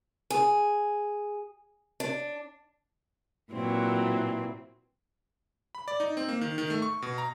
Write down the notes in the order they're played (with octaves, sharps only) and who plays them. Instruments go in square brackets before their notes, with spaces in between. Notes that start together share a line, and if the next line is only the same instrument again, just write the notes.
[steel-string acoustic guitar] G#4
D4
[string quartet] A#2 E3 F#3 C4
[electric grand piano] B5
D5
D#4
C4
A#3
D#3
D#3
A3
C#6
B2
A#5